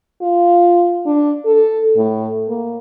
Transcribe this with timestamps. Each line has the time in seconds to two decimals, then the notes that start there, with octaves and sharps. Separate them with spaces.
0.22 F4
1.06 D4
1.45 A4
1.97 A2
2.49 A#3